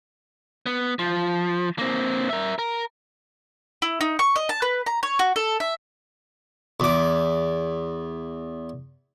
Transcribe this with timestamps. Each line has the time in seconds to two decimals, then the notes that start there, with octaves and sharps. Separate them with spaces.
0.66 B3
0.99 F3
1.79 A#3 C4
2.29 A#4 E5
2.59 A#4
3.82 E4
4.01 D#4
4.19 C#6
4.36 D#5
4.49 A5
4.62 B4
4.86 A#5
5.03 C#5
5.19 F#4
5.36 A4
5.60 E5
6.80 E2 D6